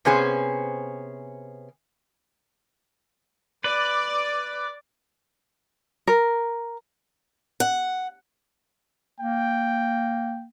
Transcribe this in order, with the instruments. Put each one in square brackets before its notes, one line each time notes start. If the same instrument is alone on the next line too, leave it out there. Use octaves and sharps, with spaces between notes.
[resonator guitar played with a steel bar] C3 B3 C#4 G#4 C5
[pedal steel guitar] B4 [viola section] D5
[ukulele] A#4
[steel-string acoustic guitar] F#5
[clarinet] A#3 [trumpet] G5